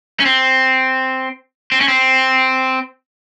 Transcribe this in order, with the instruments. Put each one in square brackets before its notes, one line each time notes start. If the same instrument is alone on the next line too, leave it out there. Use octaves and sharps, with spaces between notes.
[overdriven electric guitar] C#4
C4
C4
C#4
C4